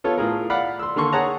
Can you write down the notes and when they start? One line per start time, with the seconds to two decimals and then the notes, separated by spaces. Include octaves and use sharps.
0.04 B3 F4 A4 C#5
0.18 A2 F4 G#4 A#4
0.50 D5 F5 F#5 B5
0.79 C6 E6
0.96 D3 A#3 A4 C6 C#6
1.13 G#4 C#5 F#5 A5 A#5